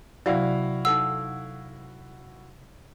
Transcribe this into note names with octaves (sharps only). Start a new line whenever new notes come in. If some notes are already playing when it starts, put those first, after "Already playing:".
C3 F#3 E4 F#4 D5 E5 F5 G5
D#4 A4 F#5 E6